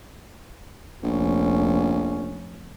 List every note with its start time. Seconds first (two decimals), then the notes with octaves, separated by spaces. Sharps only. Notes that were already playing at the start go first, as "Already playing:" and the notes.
1.03 F1 A#1 C#4